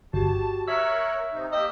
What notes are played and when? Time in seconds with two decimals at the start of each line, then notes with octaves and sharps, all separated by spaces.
0.13 G1 F#4 G4 A5
0.68 A#4 C#5 E5 C#6 E6 F#6
1.33 C3 D#4
1.53 A#3 G4 D#5 E6